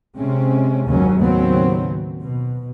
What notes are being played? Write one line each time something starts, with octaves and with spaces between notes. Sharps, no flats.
C3 G#3 C4 C#4
F#1 D#2 G#2 C#3 F#3 C#4
D#2 A2 C#3 F#3 B3 C4
B2